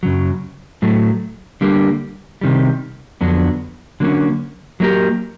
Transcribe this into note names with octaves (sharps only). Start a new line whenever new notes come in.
F#2 C#3 F#3
A2 F#3 A3
D3 G3 A#3
C3 D#3 G3
F2 D3 F#3 B3 D4
D3 F#3 A#3 C#4
F#3 A#3 D4 G4 A#4